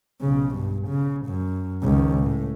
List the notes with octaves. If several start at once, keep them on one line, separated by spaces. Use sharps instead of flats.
B1 C#3
G2
C#3
F#2
C#2 D#3
A2